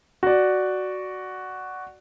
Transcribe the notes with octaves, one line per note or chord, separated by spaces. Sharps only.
F#4 D5